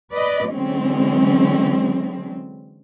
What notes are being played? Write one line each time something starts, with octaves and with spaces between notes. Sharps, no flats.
B4 D5 D#5
D3 E3 F#3 G#3 C4 C#4